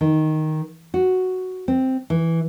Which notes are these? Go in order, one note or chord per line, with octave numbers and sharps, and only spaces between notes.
D#3
F#4
C4
E3